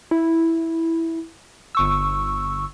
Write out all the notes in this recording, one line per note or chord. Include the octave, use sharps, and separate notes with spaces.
E4
G1 C#6 E6